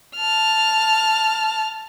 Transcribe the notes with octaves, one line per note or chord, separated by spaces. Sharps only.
A5 F6